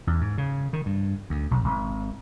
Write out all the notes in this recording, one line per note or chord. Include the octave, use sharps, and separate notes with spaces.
E2
G#2
C#3
D#3
G2
D2
B1
G#1